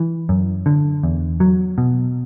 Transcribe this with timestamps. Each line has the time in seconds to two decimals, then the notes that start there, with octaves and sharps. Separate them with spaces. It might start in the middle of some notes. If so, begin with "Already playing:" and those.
Already playing: E3
0.29 F#2
0.66 D3
1.03 E2
1.40 F#3
1.78 B2